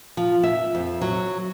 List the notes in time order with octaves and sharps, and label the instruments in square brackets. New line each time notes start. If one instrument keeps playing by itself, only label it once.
[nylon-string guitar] F3
E5
F2
F#3